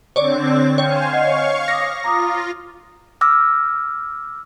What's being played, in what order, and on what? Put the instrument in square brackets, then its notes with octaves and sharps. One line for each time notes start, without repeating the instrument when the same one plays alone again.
[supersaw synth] D3 C4 [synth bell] C#5 D5
[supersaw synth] C5 F5 G#5 [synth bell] C#5 [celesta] G5 G6
[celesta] D#5 F#5 C7 [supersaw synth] F5 C#6
[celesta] C#5 D6 D#6 [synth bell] A#6
[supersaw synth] F4 [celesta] A#5 D6 D#6
[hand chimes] D6 E6 F6 A#6